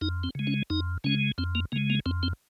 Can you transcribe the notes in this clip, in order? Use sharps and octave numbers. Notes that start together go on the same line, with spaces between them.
F2 D#4
C4
C#3 G#3
C#4
F2 D#4
C#3 G#3 C#4
F2 C4
A#3
C#3 G#3 A#3
A#3
F2 C4
C4